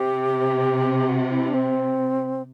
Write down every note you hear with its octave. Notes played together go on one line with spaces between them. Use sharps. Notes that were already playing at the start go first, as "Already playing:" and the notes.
Already playing: C3 G4
F#4
E4
D4
C4